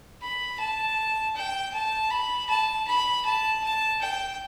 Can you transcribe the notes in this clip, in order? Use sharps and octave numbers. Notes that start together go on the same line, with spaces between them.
B5
A5
G5
A5
B5
A5
B5
A5
A5
G5